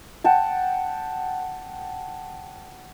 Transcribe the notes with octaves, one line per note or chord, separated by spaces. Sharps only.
F#5 G5 A5